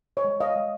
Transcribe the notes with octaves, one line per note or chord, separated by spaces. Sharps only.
C#5 D#5
G#3
D#5 F5
G#3